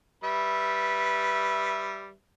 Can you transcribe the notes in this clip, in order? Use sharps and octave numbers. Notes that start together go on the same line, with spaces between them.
G3 B4 E5